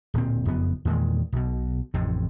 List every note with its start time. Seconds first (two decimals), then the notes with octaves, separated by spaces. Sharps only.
0.14 D1 A#2 C4
0.45 F#1 F2 B3
0.85 E2 A#2 D#3 G#3
1.32 B1 B2
1.94 A1 F2 A2 C3